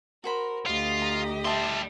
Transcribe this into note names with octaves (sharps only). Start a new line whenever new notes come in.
F#4 A#4 C5 B5
D2 F4 G4 D#5
A#5
G3 E5 G5 A5 C6